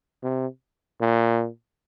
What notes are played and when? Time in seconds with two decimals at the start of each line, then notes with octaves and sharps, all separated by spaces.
0.23 C3
1.01 A#2